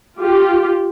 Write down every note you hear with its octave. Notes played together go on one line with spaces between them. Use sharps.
F4 G4